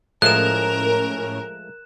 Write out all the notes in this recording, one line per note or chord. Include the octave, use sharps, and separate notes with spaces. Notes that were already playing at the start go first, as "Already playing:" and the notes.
A2 F3 G#3 A3 C#4 A#4 F#6 E7